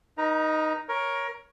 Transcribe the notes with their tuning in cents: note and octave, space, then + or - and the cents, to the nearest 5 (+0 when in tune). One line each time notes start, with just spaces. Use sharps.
D#4 +0 A#4 +45 A#5 +5
A#4 +15 C#5 +0